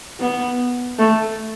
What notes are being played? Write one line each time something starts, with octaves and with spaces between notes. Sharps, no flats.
B3
A3